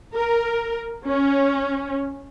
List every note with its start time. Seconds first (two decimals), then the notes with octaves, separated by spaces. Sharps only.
0.15 A#4
1.06 C#4